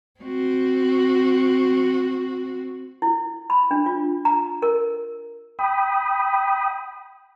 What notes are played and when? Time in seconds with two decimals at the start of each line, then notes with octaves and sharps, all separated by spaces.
0.20 C4 F#4
3.02 E4
3.50 B5
3.71 D4
3.86 F4
4.25 A#5
4.62 A#4
5.59 G5 B5 D#6